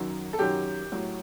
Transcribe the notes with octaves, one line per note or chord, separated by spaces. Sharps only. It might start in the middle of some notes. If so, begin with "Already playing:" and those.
Already playing: F#2 D#3 F#3
A4
F#2 D#3 F#3 G4
A2 F#3